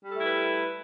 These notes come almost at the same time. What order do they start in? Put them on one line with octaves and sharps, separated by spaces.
G3 A4 A3 E4 B4